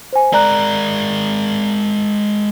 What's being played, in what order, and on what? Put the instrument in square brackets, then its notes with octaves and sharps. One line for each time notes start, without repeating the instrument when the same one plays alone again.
[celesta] C5 G#5
[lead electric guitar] G#3 A#4 [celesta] D5 A#5 F#6